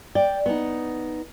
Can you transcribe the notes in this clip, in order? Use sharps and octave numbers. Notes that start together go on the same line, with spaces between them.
D5 G5
B3 D#4